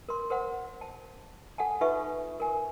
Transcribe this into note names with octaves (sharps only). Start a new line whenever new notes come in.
A#4 C6
A#4 C5 F#5
A5
A4 F#5 G#5 A5
D#4 F4 A4 B4 E5 C#6
A#4 G#5